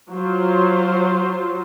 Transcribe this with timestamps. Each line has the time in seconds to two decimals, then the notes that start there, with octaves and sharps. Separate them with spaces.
0.11 F#3 F4 C5